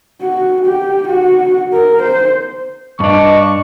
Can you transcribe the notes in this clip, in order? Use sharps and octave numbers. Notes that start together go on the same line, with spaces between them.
F#4
G4
F#4
A#4
C5
G2 D4 D#5 A5 C#6 D6